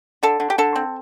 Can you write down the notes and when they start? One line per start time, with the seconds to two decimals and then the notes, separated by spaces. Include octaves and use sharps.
0.23 D3 A4
0.40 D3
0.50 G4
0.58 D3 A4
0.76 C4